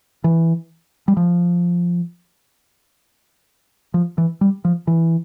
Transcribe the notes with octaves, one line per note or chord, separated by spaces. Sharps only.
E3
G3
F3
F3
E3
G3
F3
E3